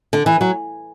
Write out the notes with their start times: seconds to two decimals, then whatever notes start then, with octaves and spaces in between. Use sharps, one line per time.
0.13 D3
0.26 E3
0.41 F#3